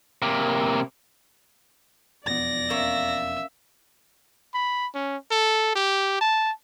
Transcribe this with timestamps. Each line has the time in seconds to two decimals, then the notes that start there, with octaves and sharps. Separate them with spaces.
0.22 C3 A#3
2.26 E1 F2 B3 D5 A#6
2.70 A#3 C#4 E5
4.54 B5
4.95 C#4
5.31 A4
5.75 G4
6.21 A5